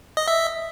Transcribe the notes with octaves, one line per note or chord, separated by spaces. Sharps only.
D#5
E5